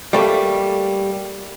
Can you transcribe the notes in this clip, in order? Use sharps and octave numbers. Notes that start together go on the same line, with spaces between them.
G3 A3 A#3